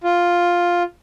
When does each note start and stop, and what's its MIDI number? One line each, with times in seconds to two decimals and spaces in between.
0.04 0.83 65